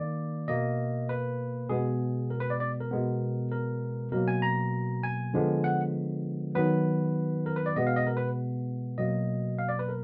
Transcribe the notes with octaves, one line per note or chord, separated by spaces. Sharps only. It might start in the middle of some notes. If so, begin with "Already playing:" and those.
Already playing: D#3 A#3 D5
B2 A#3 D#5
B4
B2 G#3 B3 G#4
A#4
B4
D5
D5
A#4
B2 G#3 B3
A#4
B2 F#3 A#3 A#4
G#5
A#5
G#5
D3 F3 G#3 B3
F#5
D#3 F#3 B3 B4
A#4
B4
D5
B2 G#3 B3 D#5
F5
D#5
A#4
B4
B2 F#3 A#3 D#5
F5
D5
B4
A#4